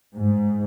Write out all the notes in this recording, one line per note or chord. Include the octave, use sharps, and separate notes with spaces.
G#2